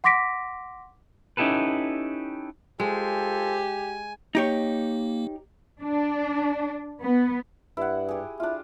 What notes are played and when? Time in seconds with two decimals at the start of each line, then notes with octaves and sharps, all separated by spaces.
0.04 F#5 C6 D6 A#6 B6 D7
1.37 C#4 D#4 E4 G4 A4 B4
2.80 G#3 F4 G4 A4 C5 G#5
4.35 A#3 D#4 G4 C#5
5.82 D4
7.02 B3
7.77 G2 E4 F#5
8.09 G4 G#4
8.40 D4 E4 F4